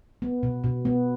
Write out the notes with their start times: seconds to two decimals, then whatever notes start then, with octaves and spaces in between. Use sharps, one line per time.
0.22 B3
0.43 B2
0.64 B2
0.85 B3